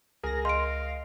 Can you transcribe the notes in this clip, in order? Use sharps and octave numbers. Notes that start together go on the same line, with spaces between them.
C#2 G#4 A#4 G#5 A#6
D#5 F5 C6 D7